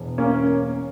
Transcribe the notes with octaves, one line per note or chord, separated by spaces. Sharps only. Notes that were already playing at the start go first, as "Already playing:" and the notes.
Already playing: E1
A#3 C#4